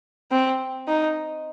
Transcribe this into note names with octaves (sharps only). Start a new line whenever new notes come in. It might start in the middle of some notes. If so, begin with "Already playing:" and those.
C4
D#4